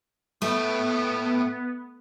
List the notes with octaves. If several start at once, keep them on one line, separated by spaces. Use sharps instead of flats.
A2 A3 B3